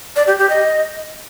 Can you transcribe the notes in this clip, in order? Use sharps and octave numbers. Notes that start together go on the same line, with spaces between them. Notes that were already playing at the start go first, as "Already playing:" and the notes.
D5
G4
G4
D#5